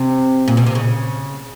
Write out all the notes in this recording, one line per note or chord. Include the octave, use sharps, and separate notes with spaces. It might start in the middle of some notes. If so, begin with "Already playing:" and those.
Already playing: C3
A#2
B2
C3
C#3